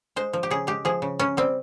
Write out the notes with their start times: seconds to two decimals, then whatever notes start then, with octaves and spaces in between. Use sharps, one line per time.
0.16 G#3 C5
0.33 F3
0.43 G4
0.51 C#3 G#4
0.67 G#3 G4
0.85 F3 G#4
1.02 C#3
1.19 C#3 C#4
1.37 G3 C4